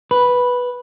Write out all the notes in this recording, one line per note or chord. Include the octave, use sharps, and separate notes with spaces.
B4